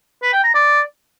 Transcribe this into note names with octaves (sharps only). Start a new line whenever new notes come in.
B4
G5
A#5
D5